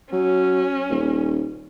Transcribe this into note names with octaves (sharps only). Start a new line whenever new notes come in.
F#3 C#4
D#1